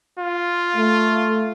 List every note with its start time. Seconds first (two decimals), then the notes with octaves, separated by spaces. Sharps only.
0.20 F4
0.76 A3